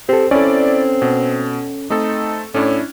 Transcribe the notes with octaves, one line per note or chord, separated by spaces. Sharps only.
C4 G4 A4
C4 C#4 E4 A4 D5
B2
A3 C4 D#4 A4
A2 C#4 D4 E4